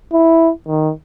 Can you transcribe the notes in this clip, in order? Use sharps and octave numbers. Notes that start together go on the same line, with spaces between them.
E4
D#3